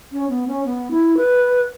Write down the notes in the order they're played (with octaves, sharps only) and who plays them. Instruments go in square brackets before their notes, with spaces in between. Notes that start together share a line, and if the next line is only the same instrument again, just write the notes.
[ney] C#4
B3
C#4
B3
E4
B4